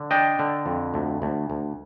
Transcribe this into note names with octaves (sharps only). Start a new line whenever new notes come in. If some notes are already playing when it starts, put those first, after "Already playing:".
Already playing: D3
D4 D#5 G5
D3
F2
D2
D2
D2